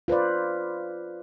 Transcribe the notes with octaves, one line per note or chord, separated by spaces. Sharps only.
F4 B4 C5 D5